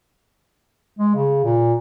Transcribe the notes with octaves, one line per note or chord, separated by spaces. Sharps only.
G#3
C#3
A#2